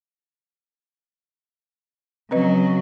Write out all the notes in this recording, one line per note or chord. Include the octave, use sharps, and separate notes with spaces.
C#3 F#3 C4 B4 D#5